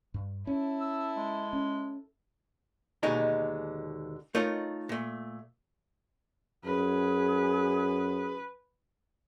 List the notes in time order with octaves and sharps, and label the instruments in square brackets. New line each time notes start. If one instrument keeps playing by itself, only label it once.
[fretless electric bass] G2
[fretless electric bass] C#4 [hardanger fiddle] E4 A4
[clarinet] E6
G#3
[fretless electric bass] C#4
[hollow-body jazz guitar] D#2 B2 D3 G#3 D#4 A#5
A3 D#4 F4 A#4 C#5 D#5
A#2 A3
[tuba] F#2 [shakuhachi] G#4 [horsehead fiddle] B4